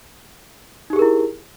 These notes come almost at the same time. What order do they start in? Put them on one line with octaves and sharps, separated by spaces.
D#4 G4 G#4 A#4 E4